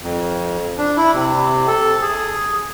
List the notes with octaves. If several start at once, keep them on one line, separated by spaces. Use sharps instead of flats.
F2
D4
E4
C3
A4
G#4